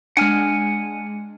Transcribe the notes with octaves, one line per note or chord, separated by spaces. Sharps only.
G#3 D4 F#5 G#5 F6